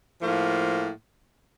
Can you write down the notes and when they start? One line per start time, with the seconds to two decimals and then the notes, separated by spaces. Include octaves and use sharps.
0.22 A2 F3 A#3